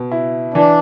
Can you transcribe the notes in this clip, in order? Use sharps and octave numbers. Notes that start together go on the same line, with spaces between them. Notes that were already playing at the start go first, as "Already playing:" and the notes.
Already playing: B2
E4
E3 D4